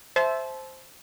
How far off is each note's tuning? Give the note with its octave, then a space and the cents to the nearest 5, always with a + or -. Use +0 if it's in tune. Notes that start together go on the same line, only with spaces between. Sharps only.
C5 +0 E5 +0 A5 -30